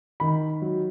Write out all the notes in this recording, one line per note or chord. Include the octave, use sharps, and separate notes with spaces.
D#3 B5
F#3